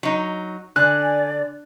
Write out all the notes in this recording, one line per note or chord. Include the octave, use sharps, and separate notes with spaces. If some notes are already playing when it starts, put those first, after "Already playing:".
F#3 D#4
D3 D5 G#5 F#6